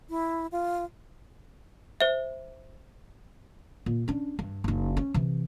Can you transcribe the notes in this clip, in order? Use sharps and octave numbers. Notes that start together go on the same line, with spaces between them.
E4
F4
C5 E5
A#2
C#4 D4
G2
F#1 D#4
C#4
C3 E3